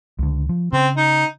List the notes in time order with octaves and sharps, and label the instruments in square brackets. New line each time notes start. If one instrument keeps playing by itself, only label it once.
[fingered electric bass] C#2 D3
F3
[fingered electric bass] C#3 [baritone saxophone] C4
[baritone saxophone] D#4